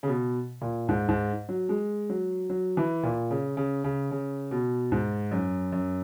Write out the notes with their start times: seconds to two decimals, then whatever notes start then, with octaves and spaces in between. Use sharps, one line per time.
0.03 C#3
0.08 B2
0.61 A#2
0.89 G#2
1.09 G#2
1.49 F#3
1.69 G#3
2.09 F#3
2.50 F#3
2.77 E3
3.03 A#2
3.31 C#3
3.57 C#3
3.84 C#3
4.11 C#3
4.51 B2
4.92 G#2
5.32 F#2
5.72 F#2